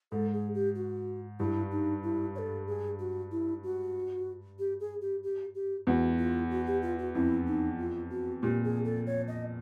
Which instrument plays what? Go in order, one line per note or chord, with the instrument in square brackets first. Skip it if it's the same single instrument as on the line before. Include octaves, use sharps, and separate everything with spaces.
[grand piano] G#2 [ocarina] A4
[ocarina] G#4
G4
F#4
[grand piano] G2 [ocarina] E4
[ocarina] D#4
E4
C#5
A4
G#4
F#4
E4
F#4
G4
G#4
G4
G4
G4
[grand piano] E2 [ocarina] F#4
[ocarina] F4
F#4
G4
F4
F#4
[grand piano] F2 [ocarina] E4
[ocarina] D#4
F4
F#4
[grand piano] A#2 [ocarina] G4
[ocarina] G#4
A4
C#5
D#5